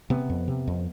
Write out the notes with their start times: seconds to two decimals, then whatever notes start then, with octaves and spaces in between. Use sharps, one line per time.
0.10 C3 B3
0.30 F2
0.48 C3
0.67 F2